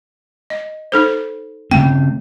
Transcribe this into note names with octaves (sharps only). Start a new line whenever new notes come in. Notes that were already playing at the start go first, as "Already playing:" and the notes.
D#5
D#4 A4 C5
C#3 A3 C4 G5